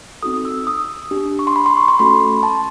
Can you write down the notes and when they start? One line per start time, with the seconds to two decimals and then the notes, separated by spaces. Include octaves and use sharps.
0.22 C4 D#4 F#4 A4 D#6
0.45 E6
0.67 D#6
1.11 D4 G4
1.39 C#6
1.47 C6
1.56 B5
1.66 C6
1.77 C#6
1.88 C6
1.99 A3 C#4 F#4 A4 B5
2.43 A5